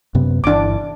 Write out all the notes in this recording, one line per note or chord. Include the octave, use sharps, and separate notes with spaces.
F#2 C3 B3
G1 E3 D4 D6